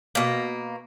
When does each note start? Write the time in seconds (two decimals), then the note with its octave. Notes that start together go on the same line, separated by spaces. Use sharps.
0.15 B2 A#3